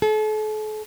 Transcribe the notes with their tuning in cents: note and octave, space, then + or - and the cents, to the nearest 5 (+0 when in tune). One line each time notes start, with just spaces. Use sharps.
A4 -40